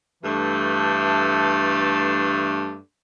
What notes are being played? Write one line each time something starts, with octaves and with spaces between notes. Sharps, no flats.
G2 E3 A3 D4